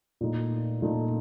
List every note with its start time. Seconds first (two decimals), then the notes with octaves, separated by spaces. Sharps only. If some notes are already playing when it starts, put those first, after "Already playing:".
0.21 A#2 A3 D#4
0.82 A#2 A3 D#4